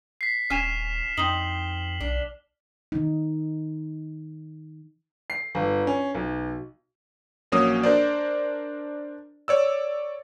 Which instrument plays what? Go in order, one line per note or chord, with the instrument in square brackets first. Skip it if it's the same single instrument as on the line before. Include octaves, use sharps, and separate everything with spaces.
[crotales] B6 C7
[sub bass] D#1 [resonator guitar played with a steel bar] C#4 G#5 [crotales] F6 E7 F7
[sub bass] F2 [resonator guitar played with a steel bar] C4 D#4 [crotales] F#7 G7
[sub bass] B1 [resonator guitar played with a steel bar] D4
[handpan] D#3 D#4
[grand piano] C7
G1
C#4
B1
[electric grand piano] A#1 F#3 A#3 C#4 D#6
D4 A#4 C5 D5
C#5 D5 E6